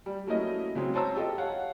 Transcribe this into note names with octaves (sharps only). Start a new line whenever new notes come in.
G3
F#3 A3 A#3 C#4 E4 D#5
C#3 F#3 G#3 C4
C5 C#5 A5 A#5 E6
F4 G4 A4 D#5
C#5 F5 F#5